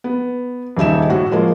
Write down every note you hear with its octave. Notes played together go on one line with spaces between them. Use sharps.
B3
D#1 C#3 D#4 E5 E7
A2 F#4
F3 G#3 A#3